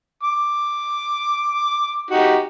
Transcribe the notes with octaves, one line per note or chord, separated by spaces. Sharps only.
D6
D#4 F#4 G4